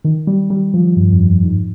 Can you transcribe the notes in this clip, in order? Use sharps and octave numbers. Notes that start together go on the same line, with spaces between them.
D#3
G3
G3
F3
G2
F2
G2
G#2